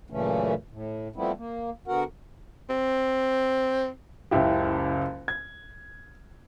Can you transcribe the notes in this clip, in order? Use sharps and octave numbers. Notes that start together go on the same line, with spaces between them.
F#2 A#2 C#3 E3 A3 C#4
A2
F3 G3 A3 B3 C4 E4
A#3
D3 B3 F#4 A#4 F#5
C4
F#1 C#2 E4 G4
G#6